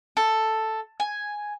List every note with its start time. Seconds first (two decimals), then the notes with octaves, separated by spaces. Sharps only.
0.17 A4
1.00 G#5